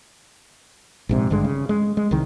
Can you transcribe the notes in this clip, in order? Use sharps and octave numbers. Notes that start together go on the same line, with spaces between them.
A#1 G#2 C3
G#1 G2 D3 G#3
C#3
G#3
G#3
C2 D#3